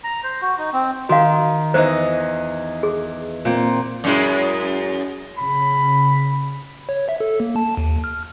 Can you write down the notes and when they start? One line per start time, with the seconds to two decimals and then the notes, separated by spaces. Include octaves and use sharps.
0.04 A#5
0.24 C5
0.41 F#4
0.58 D#4
0.73 C4
1.09 D#3 F#4 F5
1.74 E2 D#4 C5 D#5
2.83 G#4
3.45 A#2 C4
4.04 F#2 G#3 E4
5.38 C#3 B5
6.89 C#5
7.09 E5
7.20 A4
7.40 A#3
7.56 A5
7.77 D#2
8.04 F6